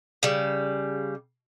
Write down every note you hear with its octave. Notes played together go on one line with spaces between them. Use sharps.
C#3 G3